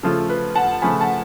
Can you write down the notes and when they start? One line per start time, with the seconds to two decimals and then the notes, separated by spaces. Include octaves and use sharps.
0.03 C#3 F3 A3 F4 A4
0.30 B4
0.55 F#5 A5
0.82 C#3 F3 A3 F4 G#5 B5
1.01 F#5 A5